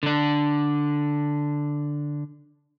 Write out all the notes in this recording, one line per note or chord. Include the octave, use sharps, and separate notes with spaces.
D3 D4